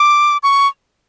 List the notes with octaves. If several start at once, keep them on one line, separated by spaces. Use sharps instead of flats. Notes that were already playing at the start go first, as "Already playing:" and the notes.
Already playing: D6
C#6